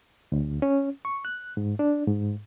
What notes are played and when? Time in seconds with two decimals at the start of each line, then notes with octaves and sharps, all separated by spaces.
0.32 D2
0.62 C#4
1.05 C#6
1.25 F#6
1.57 G#2
1.79 D4
2.07 G#2